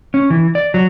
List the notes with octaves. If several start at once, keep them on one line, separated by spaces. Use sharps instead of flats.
C#4
E3
D5
F#3